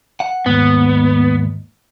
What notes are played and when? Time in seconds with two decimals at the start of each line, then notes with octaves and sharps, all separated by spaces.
0.20 F#5
0.46 D#2 G#2 B3